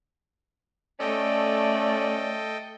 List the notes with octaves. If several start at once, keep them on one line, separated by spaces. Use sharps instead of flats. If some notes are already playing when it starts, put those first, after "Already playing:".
A3 C#4 A4 D5 D#5 G5